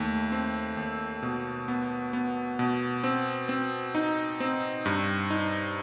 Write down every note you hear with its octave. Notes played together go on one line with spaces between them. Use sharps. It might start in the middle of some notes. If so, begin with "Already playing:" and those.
Already playing: D#2 A3
C4
D#2
B2
B3
B3
B2
C4
C4
D#4
C4
G2
D#4